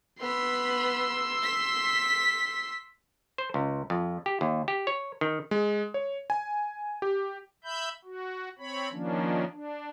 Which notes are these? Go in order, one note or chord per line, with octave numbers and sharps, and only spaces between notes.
B3 B5 C6 E6
B6
C5
C#2
F2
G4
D#2
G4
C#5
D#3
G#3
C#5
G#5
G4
E5 B5 G6
F#4
C4 C#5 B5
D#3 F3 A#3 C#4 D4
D4